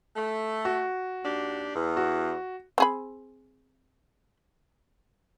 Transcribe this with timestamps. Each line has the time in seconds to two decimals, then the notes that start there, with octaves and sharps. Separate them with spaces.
0.16 A3
0.65 F#4
1.24 D#2 D4 G4
1.74 E2
1.97 F#4
2.78 C4 G#4 B5